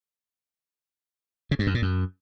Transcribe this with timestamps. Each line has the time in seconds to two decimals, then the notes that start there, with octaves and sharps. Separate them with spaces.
1.51 C#3
1.59 G2
1.67 F#2
1.74 A#2
1.82 F#2